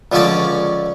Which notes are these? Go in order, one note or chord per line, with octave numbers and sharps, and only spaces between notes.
C#2 D3 F3 C#4 C#5 D5